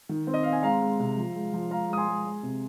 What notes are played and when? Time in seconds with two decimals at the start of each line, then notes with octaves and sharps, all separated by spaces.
0.09 D#3
0.27 C4
0.34 D#5
0.43 C4 F5
0.53 G#5
0.63 G#3 F5 A#5
0.82 G#3
1.00 C3
1.17 F3
1.35 G#3
1.54 F3
1.70 G#3 F5 A#5
1.88 G#3 D#6
1.97 G#5 C6
2.08 G#3
2.25 G#3
2.43 C3